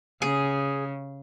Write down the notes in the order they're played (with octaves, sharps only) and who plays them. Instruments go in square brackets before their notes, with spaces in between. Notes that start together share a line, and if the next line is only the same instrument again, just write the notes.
[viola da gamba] C#3 [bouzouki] G#4